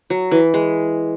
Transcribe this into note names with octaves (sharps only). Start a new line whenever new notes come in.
F#3
E3
G#3